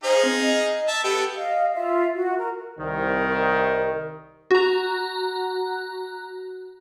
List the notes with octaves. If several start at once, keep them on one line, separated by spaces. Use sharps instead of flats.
D#4 G#4 C5 F5
C4
D#5
E5 A5
B3 G4 A4 G5
D#5 F5
F4 E5
F#4
A#4
C2 D#3
F#4 A#5